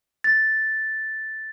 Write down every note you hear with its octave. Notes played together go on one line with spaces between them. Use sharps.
A6